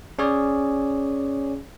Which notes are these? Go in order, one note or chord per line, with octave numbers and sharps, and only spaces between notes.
C#4 G#4 C#5 D5